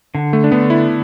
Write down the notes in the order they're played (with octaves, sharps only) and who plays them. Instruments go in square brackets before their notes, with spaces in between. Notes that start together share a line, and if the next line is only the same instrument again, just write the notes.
[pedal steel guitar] D3
[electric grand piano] A3
D4
[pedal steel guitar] D3 [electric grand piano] B3
[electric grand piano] E4